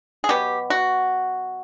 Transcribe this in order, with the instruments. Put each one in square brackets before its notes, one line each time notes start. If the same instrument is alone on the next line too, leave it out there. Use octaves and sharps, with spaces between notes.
[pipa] G#4
B2 F#3 B3 G4
F#4